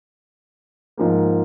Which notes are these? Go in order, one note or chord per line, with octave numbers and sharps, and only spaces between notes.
G#2 F3 A#3